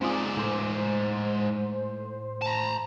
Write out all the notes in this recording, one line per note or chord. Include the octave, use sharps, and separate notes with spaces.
G#2 C4 F4 G#4 D5
A2 C5
A5 A#5